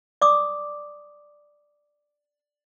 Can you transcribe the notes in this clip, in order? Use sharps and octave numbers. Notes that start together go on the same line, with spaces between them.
D5 D6 D#6